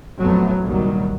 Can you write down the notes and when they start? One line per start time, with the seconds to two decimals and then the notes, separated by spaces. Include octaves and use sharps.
0.20 F2 A2 F#3 A3 B3
0.62 G1 C2 A#2 D#3 F#3 G3